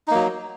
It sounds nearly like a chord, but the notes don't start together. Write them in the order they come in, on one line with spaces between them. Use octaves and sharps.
D#4 A#3 F#3